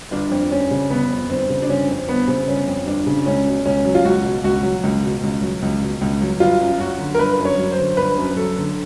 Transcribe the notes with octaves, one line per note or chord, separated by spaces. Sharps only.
G1 D4
F2
G1 C#4
C#3
G1 B3
F2
G1 C4
C#3
D4
G1 C#4
F2 C4
G1 B3
C#3 C4
G1 C#4
F2
G1 D4
C#3
C#2 C#4
B2
C#2 C#4
F#3
F4
C#2 F#4
B2
C#2 F#4
F#3
C#2
B2
C#2
F#3
C#2
B2
C#2
F#3
G1 F4
F#2
F#3 F#4
D3
A#4
G1 B4
F#2
C#5
F#3
C5
D3
G1 B4
F#2
F#3 A4
D3